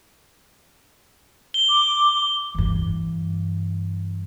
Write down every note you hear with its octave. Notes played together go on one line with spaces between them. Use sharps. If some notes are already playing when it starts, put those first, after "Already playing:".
G7
D6
G2 E3